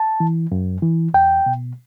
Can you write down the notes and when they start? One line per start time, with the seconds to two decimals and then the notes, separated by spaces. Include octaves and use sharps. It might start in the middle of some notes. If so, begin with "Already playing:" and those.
Already playing: A5
0.20 E3
0.52 F#2
0.82 E3
1.14 E2 G5
1.46 B2